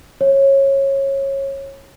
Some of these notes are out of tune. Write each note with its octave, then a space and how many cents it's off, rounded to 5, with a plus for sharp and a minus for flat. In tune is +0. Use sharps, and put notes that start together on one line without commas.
C#5 -20